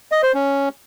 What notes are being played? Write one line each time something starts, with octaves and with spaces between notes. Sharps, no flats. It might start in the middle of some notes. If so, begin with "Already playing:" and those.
D#5
C5
C#4